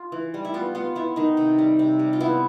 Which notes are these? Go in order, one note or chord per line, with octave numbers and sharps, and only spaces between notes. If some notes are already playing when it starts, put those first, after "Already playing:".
Already playing: F4
E3
G3
E4
B3 F4
B3 F4
B3 E4
D#3 D#4
C3
G3
C3
G3
F4
B3 E4